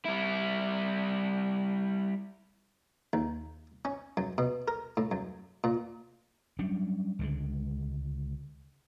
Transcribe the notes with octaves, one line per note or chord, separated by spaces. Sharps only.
G3 E4
D#2
C#4
F#2
B2
A#4
A2
F#2
A#2
F#3 G3 C#4 D4
C#2 D3 G#3